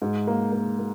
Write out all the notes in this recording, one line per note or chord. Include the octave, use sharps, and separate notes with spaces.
G#2
A#3
A#3
A#3